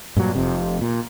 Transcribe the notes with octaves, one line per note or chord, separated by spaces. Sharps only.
G2 A#2 F3 F#3
F1 F2 C3
A#2